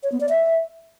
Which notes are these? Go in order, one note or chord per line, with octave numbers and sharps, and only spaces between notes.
C#5
B3
D5
E5